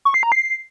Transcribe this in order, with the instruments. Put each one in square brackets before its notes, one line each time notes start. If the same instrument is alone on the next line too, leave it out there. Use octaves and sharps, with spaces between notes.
[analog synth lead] C#6
C7
A#5
C7